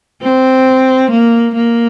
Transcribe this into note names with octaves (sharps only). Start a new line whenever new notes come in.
C4
A#3
A#3